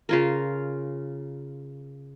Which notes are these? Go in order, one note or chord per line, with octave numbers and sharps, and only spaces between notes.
C#3 F4 A#4